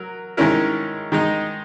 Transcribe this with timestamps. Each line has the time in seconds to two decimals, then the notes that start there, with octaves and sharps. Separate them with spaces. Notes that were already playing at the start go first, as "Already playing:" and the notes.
Already playing: F#3 A#4
0.37 D#3 G#3 C#4 E4 A#4
1.12 D#3 G#3 D#4